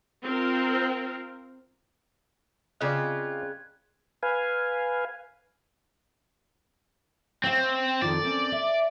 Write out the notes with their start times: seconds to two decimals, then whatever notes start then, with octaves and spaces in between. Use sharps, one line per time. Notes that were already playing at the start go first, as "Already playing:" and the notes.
0.24 C4 F4 A#4
2.81 C#3 C4 F4 D5 D#5 F#6 G#6
4.23 B4 F5 G#5
7.44 C4 C#5 F5
8.02 F2 D#3 F4 D5
8.23 A#3 C4 C#4
8.52 E5